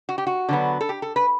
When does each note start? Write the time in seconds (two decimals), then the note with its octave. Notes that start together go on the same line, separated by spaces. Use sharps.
0.09 F#4
0.18 G4
0.27 F#4
0.49 D3 F#3 B3
0.81 A4
0.89 G4
1.02 A4
1.16 B4